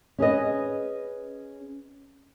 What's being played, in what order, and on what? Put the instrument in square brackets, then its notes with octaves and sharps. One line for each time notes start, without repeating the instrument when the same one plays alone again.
[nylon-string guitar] C#4 G#4 B4 D#5